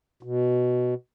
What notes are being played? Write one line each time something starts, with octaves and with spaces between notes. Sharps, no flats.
B2